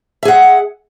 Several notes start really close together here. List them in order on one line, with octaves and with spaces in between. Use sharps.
E5 G#4 F#5